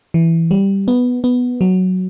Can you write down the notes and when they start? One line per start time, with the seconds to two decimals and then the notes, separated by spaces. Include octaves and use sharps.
0.14 E3
0.51 G3
0.88 B3
1.24 B3
1.61 F#3